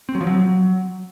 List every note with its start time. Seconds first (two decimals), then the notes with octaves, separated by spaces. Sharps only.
0.09 C4
0.15 F#3
0.21 F3
0.27 F#3